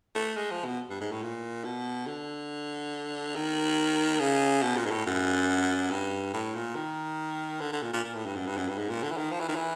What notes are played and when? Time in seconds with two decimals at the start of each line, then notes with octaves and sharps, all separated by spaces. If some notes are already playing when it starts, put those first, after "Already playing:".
0.15 A3
0.37 G#3
0.51 F3
0.65 B2
0.90 G2
1.01 G#2
1.12 A2
1.23 A#2
1.65 B2
2.07 D3
3.35 D#3
4.20 C#3
4.62 B2
4.77 A#2
4.85 G#2
4.91 A2
5.06 F#2
5.91 G2
6.34 A2
6.55 A#2
6.76 D#3
7.61 D3
7.73 D3
7.82 A#2
7.93 A#2
8.04 A#2
8.15 A2
8.26 G2
8.36 F#2
8.46 G2
8.57 F#2
8.68 G2
8.78 G#2
8.89 A#2
9.03 D3
9.11 E3
9.17 D#3
9.31 F3
9.40 E3
9.49 D#3
9.56 E3